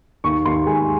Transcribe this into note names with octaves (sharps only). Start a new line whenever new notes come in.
D#2 C#6
D#2 C6
G#3 G#5